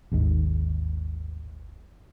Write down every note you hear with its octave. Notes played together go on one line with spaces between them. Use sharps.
G#1 D#2 G#2